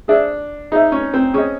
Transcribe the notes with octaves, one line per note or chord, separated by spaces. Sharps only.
D4 G#4 C5 E5
D#4 G#4 C5 E5
C#4
C4
C#4 G#4 C5 D#5